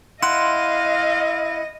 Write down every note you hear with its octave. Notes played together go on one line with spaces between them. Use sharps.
E4 D#5 F5 F#5 C6